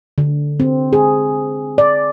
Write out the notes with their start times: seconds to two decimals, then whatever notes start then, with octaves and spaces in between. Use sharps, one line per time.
0.18 D3
0.60 C4
0.93 G#4
1.78 D5